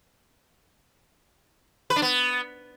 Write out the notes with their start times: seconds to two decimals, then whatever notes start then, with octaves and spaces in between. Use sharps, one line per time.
1.90 B4
1.96 D4
2.02 B3